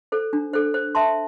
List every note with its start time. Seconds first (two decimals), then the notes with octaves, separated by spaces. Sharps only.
0.12 A4 C5
0.33 D4
0.53 A4 C5
0.74 C5
0.95 E5 A5 C6